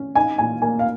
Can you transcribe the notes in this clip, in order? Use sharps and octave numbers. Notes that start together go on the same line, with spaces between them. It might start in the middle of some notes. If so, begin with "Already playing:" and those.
Already playing: C#4
D#4 G#5
A#2 G#5
A#3 G#5
F5